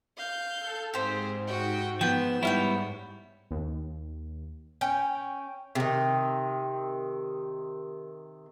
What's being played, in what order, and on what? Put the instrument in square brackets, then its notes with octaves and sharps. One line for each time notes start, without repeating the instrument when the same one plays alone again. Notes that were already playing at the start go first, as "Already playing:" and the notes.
[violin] F5 G6
[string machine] A4
[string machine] G#2 [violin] C4 G#4 [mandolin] G4 C5
[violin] F#4 G5
[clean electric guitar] F3 B3 [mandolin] G5 [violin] E7
[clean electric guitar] G3 B3 E4 [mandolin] C#5 F5 G5
[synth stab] D#2
[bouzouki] C#4 [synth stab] G5
[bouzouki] C3 D#3